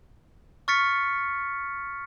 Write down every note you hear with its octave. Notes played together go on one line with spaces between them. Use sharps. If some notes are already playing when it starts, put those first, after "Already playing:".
C#6 F6 A6 B6 C#7